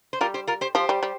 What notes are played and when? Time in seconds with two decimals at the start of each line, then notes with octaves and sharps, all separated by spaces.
0.13 C5
0.21 G3 F4 A#4
0.34 G4 C5
0.47 F4 A#4
0.61 G4 C5
0.75 F3 G4 C5
0.89 G3
1.03 G3